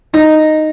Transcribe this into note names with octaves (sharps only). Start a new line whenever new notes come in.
D#4